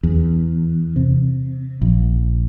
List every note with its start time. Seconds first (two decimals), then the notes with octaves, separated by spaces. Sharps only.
0.03 E2
0.96 C3
1.81 A#1